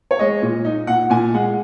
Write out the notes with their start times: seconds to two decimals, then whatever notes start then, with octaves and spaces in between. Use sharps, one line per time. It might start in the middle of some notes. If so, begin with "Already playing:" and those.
0.11 C#5
0.19 G#3 D#5
0.42 A#2
0.65 D#4
0.87 A#2 F#5
1.10 A#2 G#5
1.34 G#3 F#5